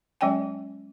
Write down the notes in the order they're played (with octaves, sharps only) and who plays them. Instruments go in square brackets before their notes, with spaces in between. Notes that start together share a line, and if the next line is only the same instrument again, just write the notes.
[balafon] F#3 G#3 C#4 D5 G5 G#5